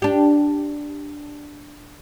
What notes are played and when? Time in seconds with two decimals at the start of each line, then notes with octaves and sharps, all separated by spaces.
0.02 D4 G4